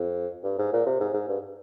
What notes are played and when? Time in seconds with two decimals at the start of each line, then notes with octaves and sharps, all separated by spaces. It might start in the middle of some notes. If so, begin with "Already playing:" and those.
Already playing: F2
0.44 G2
0.59 G#2
0.73 A#2
0.86 C3
1.00 G#2
1.14 G#2
1.29 G2